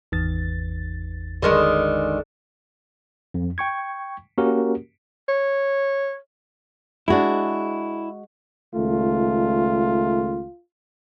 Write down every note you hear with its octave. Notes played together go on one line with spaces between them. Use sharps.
G#1 E2 A6
D3 D#3 G#3
F2
G5 C#6 G#6
A#3 C#4 F#4 G4 A#4
C#5
G#3 D4 E4 F#4
C#2 D#3 A3 F4